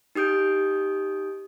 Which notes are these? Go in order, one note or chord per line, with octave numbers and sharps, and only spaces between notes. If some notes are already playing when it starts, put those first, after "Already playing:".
D#4 G4 D#6 G6 D7